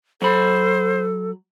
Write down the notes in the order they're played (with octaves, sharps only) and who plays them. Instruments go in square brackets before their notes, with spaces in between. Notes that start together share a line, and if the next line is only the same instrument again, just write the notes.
[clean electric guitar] F#3 B5 [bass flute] A4 [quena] C5